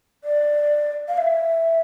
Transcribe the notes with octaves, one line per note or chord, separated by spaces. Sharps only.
D5
F5
E5